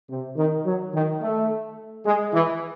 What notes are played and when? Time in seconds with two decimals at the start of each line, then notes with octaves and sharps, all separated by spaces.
0.10 C3
0.37 D#3
0.66 F#3
0.94 D#3
1.22 A3
2.06 G#3
2.33 E3